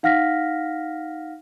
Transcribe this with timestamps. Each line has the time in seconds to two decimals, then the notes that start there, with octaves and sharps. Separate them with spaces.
0.03 D#4 F5 F#5 F6 A#6 B6